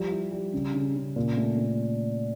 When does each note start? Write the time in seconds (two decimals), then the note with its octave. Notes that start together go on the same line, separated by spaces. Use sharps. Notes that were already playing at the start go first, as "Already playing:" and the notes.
Already playing: F3 G3
0.11 E4
0.31 G3
0.53 C#3
0.74 C#3
0.96 C#3
1.16 A#2
1.38 A3
1.58 A3